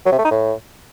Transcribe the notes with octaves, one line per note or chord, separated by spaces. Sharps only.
F#3
C3
A3
D#4
A2